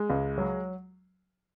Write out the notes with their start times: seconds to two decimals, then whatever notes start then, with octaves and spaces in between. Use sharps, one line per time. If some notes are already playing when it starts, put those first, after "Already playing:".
Already playing: G#3
0.10 C#2
0.38 F#3